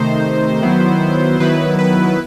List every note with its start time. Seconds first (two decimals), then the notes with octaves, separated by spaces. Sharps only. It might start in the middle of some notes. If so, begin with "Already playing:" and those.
Already playing: C3 D#3 A3 D#4 C5
0.62 D#3 F#3 B3 E4
1.40 D#3 F#3 B3 E4 B4
1.79 B4